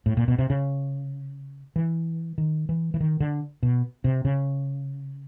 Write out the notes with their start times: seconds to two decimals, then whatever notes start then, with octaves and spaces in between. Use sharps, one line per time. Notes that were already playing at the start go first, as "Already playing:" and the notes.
0.06 A2
0.17 A#2
0.28 B2
0.39 C3
0.50 C#3
1.76 E3
2.38 D#3
2.69 E3
2.94 E3
3.00 D#3
3.20 D3
3.63 B2
4.04 C3
4.25 C#3